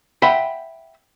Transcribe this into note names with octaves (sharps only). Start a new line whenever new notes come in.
E5 F#5 G5 B5 C6